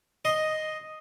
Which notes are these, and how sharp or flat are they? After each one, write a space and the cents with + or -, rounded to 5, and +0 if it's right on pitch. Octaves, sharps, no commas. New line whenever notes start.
D#5 +0 C6 +0